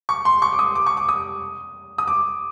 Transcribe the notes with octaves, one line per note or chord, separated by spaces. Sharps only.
C#6
C6
C#6
D6
D#6
D6
C#6
D6
D#6
D#6
D6